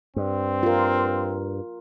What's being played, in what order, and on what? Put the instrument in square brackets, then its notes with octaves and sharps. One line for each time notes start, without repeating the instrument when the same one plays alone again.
[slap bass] G2 [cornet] C4
[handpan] F4 A#4